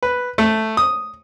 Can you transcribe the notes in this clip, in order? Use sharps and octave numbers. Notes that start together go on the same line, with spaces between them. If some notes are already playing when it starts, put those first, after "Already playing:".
B4
A3
D#6